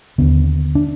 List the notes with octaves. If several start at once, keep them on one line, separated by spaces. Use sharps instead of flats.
D#2 D3 B3
D4